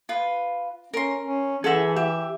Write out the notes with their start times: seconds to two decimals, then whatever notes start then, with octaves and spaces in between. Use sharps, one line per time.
0.09 F4 B4
0.94 C#4 A#4 C6
1.24 C#4
1.64 E3 G#4 A4 E5 F#5
1.96 G4 E5